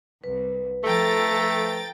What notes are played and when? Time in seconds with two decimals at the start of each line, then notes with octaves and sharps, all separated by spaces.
0.24 C2 B4
0.84 F3 A3 A4 G5 A#5 A6